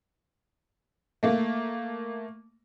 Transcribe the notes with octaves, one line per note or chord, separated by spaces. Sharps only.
A3 A#3